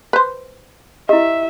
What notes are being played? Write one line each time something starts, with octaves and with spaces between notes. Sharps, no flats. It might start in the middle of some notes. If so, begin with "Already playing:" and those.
B4 C5
E4 G4 D#5 E5